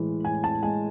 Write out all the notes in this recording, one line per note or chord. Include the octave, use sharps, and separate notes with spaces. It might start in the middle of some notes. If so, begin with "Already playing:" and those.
Already playing: A2 E3 G#3
A2 G#5
A5
G#3 G#5